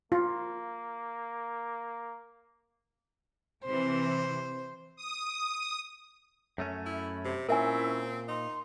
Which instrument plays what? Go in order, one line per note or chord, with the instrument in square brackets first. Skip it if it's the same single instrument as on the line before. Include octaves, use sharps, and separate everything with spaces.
[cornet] A#3 [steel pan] F4
[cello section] C3 E3 [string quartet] C5
[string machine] D#6
[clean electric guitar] F#2 A3 C#4
[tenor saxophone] E4 [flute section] B5
[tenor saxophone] C3
[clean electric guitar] A#2 [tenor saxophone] C4 [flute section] C#4 E4 E6 [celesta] A#4 E5 G#5
[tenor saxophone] D#4 [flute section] C6